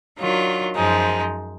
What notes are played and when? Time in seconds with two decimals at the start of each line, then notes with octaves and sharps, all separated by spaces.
0.18 D#3 F#3 D4 F4
0.75 F#2 F3 G#3 D#4